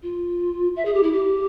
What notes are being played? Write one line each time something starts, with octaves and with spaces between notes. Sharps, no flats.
F4
E5
G#4
G4
E4
G4